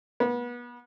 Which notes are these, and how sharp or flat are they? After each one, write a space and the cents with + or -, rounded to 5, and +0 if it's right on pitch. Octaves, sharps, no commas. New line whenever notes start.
B3 -30